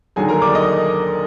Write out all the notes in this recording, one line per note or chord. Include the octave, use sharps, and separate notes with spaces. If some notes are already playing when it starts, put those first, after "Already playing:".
D#2 D3 F#3 G#4 G#5
A#4 A#5
D5 D6
D#5 D#6